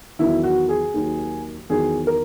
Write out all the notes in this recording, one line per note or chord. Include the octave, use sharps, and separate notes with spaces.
E2 D#3 F#3 E4
F#4
G#4
D#2 D#3 F#3
E2 D#3 F#3 G#4
A#4